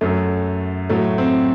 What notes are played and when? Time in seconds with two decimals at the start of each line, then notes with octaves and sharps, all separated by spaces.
0.01 F#2 F#3 A3
0.90 A2 F#3 A3
1.18 C4